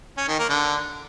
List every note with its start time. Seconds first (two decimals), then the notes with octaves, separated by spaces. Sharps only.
0.18 C#4
0.28 D#3
0.39 A#3
0.50 D3